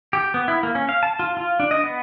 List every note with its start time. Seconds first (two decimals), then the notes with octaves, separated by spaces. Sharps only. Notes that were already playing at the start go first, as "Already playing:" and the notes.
0.13 G4
0.34 B3
0.48 E4
0.63 A#3
0.75 C#4
0.89 F5
1.03 A5
1.19 F4
1.37 F4
1.60 D4
1.71 D#5
1.84 B3